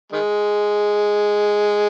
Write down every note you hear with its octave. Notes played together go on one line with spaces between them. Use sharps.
D#3 G#3